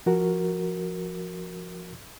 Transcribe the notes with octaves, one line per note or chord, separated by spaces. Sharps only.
F3 F#4 A#4